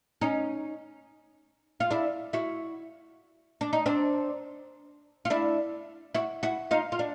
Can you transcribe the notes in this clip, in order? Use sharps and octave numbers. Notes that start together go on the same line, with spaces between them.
C#4 D#4
F4
D4 E4
E4 F#4
D4
D#4
C4 D4
F4
D4 E4
E4 F#4
E4 F#4
D#4 F4
F4
D4